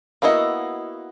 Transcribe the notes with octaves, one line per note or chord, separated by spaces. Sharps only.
A#3 B3 E4 F#4 D#5